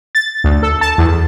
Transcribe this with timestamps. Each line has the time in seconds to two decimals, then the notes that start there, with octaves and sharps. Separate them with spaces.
0.15 A6
0.44 D2
0.63 A4
0.81 A5
0.98 E2